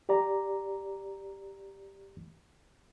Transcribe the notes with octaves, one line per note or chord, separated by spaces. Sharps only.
G4 D5 A#5